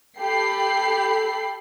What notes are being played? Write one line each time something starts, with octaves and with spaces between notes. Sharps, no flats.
G4 A4 G5 B5 C7